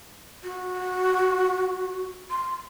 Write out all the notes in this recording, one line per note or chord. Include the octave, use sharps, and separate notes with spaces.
F#4
C6